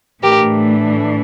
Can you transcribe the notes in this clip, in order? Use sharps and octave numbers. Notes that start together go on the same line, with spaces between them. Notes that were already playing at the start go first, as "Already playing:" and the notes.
A2 E3 A3 D4 G4 A#4